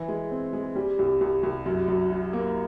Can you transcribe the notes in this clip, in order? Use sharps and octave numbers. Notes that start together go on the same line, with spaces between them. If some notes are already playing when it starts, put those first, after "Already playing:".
Already playing: E3
G#3
C4
G#3
G3
C2
C2
C2
F#2
F#2
F#3
A#3